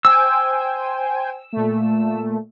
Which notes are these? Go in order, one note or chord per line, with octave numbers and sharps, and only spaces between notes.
C5 G5 G#5 E6
A#2 A3